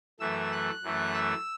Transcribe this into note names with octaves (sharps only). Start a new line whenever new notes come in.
F#2 E3 A3 E6
F#6
F#2 E3 A3
E6